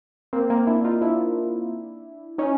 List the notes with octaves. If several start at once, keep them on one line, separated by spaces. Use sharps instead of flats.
A#3 C4
A#3 C4
D4 E4
D#4 F4
D4 E4
C#4 D#4